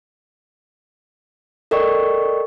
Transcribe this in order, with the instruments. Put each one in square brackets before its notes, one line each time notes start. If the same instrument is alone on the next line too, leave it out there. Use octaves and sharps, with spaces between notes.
[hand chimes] A4 A#4 D5 D#5 G5 C#6